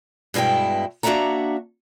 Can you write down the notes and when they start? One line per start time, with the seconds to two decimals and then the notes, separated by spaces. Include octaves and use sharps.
0.34 G2 B2 G#3 E4 G5
1.03 A#3 D4 F#4 E5 F#5 A#5